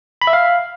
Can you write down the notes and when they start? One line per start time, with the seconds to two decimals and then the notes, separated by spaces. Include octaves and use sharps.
0.22 B5
0.27 E5
0.33 F5